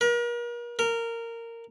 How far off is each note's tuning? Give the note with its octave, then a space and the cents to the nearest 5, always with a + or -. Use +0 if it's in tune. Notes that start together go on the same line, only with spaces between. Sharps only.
A#4 +40
A#4 -15